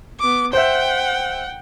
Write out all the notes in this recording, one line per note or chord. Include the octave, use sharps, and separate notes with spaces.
B3 D6
C5 E5 F#5 G5